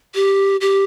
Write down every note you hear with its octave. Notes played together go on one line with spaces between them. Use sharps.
G4
G4